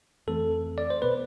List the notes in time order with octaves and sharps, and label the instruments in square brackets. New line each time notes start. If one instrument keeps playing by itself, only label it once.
[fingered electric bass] F2 E3 A3 C4 [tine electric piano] A4
[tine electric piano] D5
C5
[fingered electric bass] B2 B3 [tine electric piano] B4